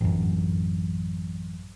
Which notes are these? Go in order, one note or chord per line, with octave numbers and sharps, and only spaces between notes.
A1 F#2